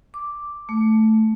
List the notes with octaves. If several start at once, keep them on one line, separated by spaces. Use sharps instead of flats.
D6
A3